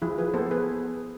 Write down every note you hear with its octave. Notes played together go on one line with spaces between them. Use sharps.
F3 E4 G#4
G#4 B4
B3 A4 C5
G#4 B4